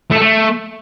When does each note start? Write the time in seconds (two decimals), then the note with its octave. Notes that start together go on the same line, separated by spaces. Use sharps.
0.11 A3
0.16 A4
0.21 A3